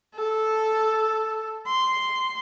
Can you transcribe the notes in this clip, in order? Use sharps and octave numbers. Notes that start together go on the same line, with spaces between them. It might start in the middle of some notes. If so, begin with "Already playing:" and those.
A4
C6